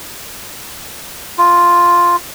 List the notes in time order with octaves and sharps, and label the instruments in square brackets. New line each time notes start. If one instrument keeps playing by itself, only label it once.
[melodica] F4